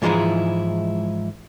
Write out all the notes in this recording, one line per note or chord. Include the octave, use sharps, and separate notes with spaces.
G#2 E3 F3 G#3 D#4 E4